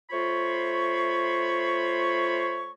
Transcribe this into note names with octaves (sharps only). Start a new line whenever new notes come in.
A3 F4 C5 C#5 B5 C#6